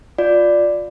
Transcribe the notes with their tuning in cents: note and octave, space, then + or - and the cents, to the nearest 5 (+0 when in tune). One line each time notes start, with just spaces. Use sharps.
F4 +15 D5 +0